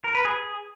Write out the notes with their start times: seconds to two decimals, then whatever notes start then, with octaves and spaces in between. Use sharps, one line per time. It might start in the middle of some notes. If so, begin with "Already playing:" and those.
0.04 A#4
0.15 B4
0.25 G#4